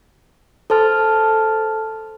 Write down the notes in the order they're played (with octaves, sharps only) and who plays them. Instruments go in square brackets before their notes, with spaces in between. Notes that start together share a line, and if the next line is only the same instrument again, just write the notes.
[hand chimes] A4 C5 A5 F6